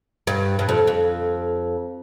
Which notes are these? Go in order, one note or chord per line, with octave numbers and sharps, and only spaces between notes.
G2
G2
F2
F2